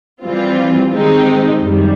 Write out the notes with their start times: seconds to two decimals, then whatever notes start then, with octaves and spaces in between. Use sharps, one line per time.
0.23 E3 G3 C4 F4
0.92 D#3 G#3 C4 D#4 G4
1.61 F#2 D#3 G3